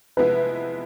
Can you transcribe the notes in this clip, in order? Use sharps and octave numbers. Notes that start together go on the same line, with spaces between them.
C3 F3 G#3 B3 E4 B4